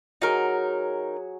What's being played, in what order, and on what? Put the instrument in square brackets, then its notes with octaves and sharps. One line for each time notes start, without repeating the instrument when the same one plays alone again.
[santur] F#3 F#4 G#4 [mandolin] D#4 A#4